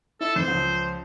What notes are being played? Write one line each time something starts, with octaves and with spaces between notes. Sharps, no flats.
E4 A4
F2 E3 C5
C#2 F3